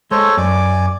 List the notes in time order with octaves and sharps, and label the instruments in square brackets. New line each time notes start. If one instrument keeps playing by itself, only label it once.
[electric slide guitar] G#3 [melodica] A4 C5 C#5
[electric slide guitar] F#2 [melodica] D5 G#5 D6